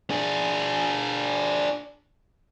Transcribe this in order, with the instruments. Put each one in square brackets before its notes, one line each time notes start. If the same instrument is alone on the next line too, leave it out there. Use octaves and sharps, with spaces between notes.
[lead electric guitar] D4 G#4